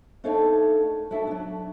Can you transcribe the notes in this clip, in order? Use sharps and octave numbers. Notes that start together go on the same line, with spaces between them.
A3 D4 D#4 A4 C#5 F5
D4 E4 F#4 A4 E5
F#3 D4